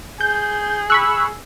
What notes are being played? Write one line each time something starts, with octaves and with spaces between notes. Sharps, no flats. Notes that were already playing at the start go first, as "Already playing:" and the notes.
G#4 G6
B5 C#6 E6 F#6